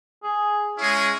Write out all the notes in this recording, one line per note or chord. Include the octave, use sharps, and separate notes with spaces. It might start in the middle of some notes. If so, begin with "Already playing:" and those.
G#4
G#3 C#4 E4 G#4